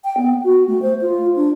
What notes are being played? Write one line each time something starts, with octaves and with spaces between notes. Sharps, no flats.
G5
B3
F#4
A3
C5
F4
D4